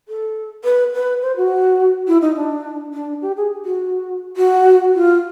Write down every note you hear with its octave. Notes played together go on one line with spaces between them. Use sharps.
A4
B4
B4
C5
F#4
E4
D#4
D4
D4
G4
G#4
F#4
F#4
F4